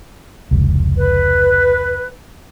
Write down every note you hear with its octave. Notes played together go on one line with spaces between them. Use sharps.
F1 C#2
B4